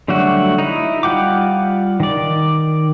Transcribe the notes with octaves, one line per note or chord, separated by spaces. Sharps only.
D3 F#3 G3 A3 F#4
D#4 E4
G3 F4 F#5 G5 D6
D#3 D5